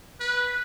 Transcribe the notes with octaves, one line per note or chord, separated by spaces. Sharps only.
B4